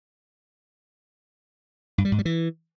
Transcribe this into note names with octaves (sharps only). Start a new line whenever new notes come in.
G2
G3
G#2
G3
E3